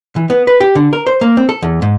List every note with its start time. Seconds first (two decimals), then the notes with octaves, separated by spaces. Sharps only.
0.16 E3
0.30 B3
0.47 B4
0.60 G4
0.75 D3
0.93 A#4
1.07 C5
1.21 A#3
1.37 C4
1.49 A4
1.62 E2
1.82 G#2